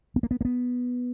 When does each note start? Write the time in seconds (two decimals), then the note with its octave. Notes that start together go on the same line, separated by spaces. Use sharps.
0.16 B3
0.23 A#3
0.31 B3
0.41 A#3
0.45 B3